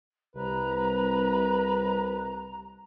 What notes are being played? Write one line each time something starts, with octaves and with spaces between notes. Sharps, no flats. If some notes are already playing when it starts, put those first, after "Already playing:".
C2 B4 A#5